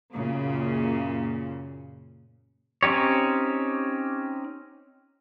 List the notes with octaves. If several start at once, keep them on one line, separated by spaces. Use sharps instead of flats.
F#2 A#2 C#3
C4 C#4 D#4 G4 C#5